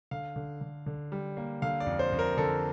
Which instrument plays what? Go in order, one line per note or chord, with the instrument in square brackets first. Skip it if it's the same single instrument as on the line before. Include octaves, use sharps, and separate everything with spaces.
[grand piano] D3 F5
D3
D3
D3
G3
A#3
D3 F5
D5
F2
C5
F2
A#4
D3 A4